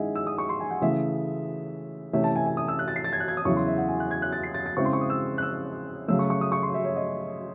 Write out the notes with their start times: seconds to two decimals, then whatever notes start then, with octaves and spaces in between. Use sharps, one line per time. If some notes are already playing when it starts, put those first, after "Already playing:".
Already playing: D#3 G#3 C#4 E4 D#5 E5 F#5 G#5
0.16 E6
0.27 D#6
0.38 C#6
0.49 C6
0.60 G#5
0.71 F#5
0.82 C#3 E3 A3 E5
2.13 C3 E3 A3 C#4 E5
2.24 A5
2.36 G#5
2.46 G#5
2.57 D#6
2.68 E6
2.79 F#6
2.88 A6
2.96 C7
3.04 A6
3.13 G#6
3.20 F#6
3.28 G#6
3.37 D#6
3.45 E2 C#3 F#3 C#4 E4 C#6
3.56 C6
3.67 E5
3.78 F#5
3.89 G#5
4.00 F#6
4.11 G#6
4.22 F#6
4.32 A6
4.43 C7
4.54 A6
4.66 A6
4.77 C#3 G#3 C4 E4 C#6
4.85 C6
4.93 C#6
5.01 D#6
5.10 E6
5.38 F#6
5.42 E6
6.08 C#3 F#3 A3 E6
6.19 C#6
6.30 C#6
6.41 D#6
6.52 C#6
6.63 C6
6.74 E5
6.84 C#5
6.96 D#5